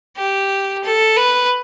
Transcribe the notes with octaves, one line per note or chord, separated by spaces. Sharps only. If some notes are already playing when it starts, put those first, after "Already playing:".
G4
A4
B4